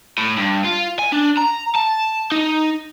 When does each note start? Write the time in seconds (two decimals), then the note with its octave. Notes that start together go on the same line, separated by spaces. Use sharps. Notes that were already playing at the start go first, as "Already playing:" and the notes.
0.18 A2
0.37 G2
0.64 F4
0.99 G#5
1.12 D4
1.38 A#5
1.76 A5
2.32 D#4